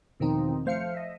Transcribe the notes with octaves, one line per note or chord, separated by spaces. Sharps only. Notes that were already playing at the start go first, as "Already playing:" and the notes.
E2 B2 D#3 F3 C4 D#4
F3 A3 C5 F5 F6 C#7
D#5 E5